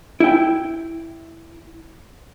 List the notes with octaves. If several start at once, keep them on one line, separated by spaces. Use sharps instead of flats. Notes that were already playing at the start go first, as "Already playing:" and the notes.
E4 G5